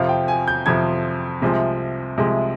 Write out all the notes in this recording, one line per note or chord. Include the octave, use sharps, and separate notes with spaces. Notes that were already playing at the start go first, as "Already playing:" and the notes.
Already playing: F2 C3 F3 F5
G5
G#5
G6
F2 C3 F3 G#6
C2 C3 F3 G#3
C2 C3 F3 G#3